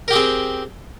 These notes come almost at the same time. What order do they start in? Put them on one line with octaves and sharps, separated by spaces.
A#4 G4 G#4 C4